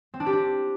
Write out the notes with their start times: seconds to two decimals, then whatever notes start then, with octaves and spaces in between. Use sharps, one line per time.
0.14 C4
0.20 D4
0.26 G4
0.33 D4